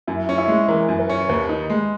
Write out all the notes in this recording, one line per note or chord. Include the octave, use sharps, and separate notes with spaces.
F#2 E4
C#4
E4
G#3
E3 A#4
F#2
B4
C#4
D#2 B4
D#4
G#3